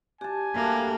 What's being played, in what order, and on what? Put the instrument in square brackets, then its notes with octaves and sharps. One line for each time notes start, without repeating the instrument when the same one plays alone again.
[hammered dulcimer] D4 A5 [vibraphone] G4 [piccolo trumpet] G#5
[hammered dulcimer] G3 A3 D4 [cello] A#3